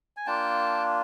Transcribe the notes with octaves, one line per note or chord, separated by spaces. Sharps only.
G#5
A#3 D4 F4 G5 A5